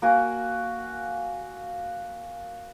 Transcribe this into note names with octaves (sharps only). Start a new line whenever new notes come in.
A#3 F#4 G#5